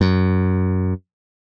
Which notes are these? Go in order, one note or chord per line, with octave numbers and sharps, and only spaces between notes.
F#2